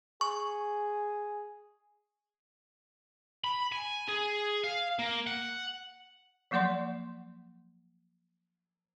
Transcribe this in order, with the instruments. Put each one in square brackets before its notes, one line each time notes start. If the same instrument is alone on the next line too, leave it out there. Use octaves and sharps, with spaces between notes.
[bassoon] G#4 [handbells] C#6
[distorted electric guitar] B5
G#5
G#4
F5
A#3
F#5
[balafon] F3 F#3 A#3 D5 F#5 C6